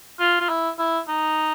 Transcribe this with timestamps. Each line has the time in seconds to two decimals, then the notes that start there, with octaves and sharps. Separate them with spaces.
0.19 F4
0.40 F4
0.49 E4
0.78 E4
1.08 D#4